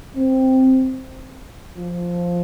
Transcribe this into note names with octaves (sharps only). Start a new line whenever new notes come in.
C4
F3